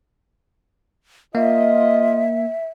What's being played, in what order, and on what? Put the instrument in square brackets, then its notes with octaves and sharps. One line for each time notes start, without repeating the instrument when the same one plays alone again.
[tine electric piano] A#3 [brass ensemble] F4 D#5 [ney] E5